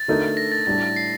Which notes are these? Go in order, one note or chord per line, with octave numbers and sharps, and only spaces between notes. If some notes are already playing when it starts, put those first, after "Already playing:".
Already playing: A6
D3 A3 D#4 A#4
A#6
A6
A2 G3 D4 A4 A6
C7